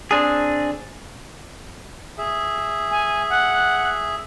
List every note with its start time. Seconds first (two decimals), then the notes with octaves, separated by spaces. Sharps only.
0.11 C4 D4 G#4
2.18 G#4 E5
2.91 G#5
3.29 F#5